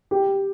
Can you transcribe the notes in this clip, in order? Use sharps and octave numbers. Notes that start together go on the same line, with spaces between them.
G4